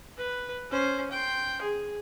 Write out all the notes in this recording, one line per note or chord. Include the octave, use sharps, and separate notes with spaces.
B4
C#4 C5
G5 C6
G#4